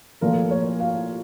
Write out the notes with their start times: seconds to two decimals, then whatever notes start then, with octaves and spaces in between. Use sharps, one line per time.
0.21 A#2 F3 A3 A#4
0.51 C#5
0.80 F5